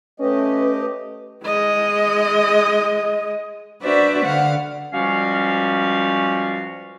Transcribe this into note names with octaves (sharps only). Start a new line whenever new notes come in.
A3 C#4 G4 B4 D#5
G#3 D#5
D4 F#4 B4 C5 D5 E5
D3 F5 F#5
C#2 F3 G3 C#4 F#4 F5